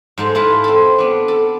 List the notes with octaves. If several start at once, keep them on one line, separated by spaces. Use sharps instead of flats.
G#2 G#3 A4
E4 F4 A4 B4
C4 A4
B3 D4
A4